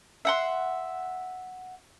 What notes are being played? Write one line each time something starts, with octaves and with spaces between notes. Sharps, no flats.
E5 F#5 C6